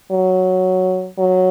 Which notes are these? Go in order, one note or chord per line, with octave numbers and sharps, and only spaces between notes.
F#3
F#3